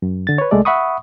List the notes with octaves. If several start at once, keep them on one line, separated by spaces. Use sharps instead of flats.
F#2
D3 A6
B4 C#5
C2 G#3 A3 A4 D5
E5 F#5 B5 C#6 D#6